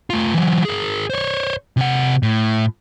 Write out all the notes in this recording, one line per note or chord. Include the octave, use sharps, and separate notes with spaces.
A3 F4
E3 F#3
G#4 A#4
C5 C#5
C3 F#5
A2